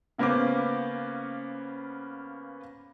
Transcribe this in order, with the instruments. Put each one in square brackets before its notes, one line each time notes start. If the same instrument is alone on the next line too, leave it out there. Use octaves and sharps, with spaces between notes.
[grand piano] C#3 A#3 B3 C#4 C5 D6